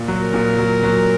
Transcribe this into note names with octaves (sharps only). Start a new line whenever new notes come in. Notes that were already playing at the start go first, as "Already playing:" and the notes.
Already playing: A#2
F#3
A#4
A#2
F#3
F#3